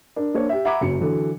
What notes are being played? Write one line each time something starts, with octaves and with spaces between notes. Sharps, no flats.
D4 A#4
A#3 D4 C5 C#5
G4 E5
E5 F#5 A#5 B5 D6 G#6
F#1 F#2 C#7
D3 E3 F#3